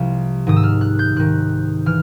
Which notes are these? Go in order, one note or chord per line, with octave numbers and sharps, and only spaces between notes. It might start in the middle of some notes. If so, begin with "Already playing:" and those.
Already playing: C2 C3 F3
G#2 D#3 D#6
E6
F6
F#6
G6
G#2 D#3 F#6
E3 F6